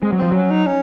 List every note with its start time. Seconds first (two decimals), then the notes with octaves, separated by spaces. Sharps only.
0.02 G#3 C4
0.12 F#3
0.18 F3 C4
0.32 F#3 C#4
0.50 D#4
0.66 C#4